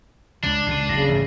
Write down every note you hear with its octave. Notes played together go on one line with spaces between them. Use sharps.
C#2 C#3 D4
C#2 B2 D3 C7 D#7
F#1 C#3 A#6 C7
A1 G#2